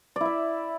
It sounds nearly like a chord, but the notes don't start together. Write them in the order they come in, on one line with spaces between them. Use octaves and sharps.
D5 E4 E5